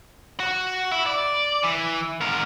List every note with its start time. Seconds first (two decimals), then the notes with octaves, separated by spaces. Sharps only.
0.40 F#4
0.92 E4
1.06 D5
1.63 E3
2.21 G#2 A#4